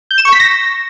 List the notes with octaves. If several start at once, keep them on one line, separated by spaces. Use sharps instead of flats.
G6
E7
C#6
B6
A#6